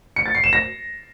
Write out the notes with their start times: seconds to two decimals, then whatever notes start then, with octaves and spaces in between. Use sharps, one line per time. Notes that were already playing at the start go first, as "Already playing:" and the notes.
0.16 C#7
0.26 A6
0.35 C7
0.44 E7
0.53 A#6